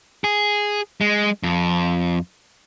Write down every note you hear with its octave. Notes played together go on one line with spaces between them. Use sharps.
G#4
G#3
F2